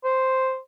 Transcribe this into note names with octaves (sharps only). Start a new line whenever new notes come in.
C5